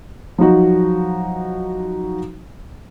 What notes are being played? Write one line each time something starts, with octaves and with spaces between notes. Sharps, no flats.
F3 F#3 D#4 F#4